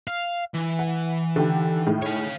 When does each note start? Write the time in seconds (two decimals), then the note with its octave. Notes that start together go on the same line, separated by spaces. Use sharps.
0.08 F5
0.54 E3
0.79 F#5
1.36 D3 D#3 G4
1.86 A2 D#3 G#3
2.02 C#5 F5